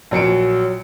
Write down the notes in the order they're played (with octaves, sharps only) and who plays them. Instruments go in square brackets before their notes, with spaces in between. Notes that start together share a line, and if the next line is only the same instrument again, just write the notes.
[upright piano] A#1 F#3 C#7 D7